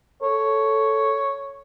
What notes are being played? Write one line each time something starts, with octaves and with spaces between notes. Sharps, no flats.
A4 C#5